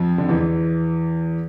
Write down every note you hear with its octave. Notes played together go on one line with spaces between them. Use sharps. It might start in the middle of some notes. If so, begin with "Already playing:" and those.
Already playing: F2 F3
D3
E2 E3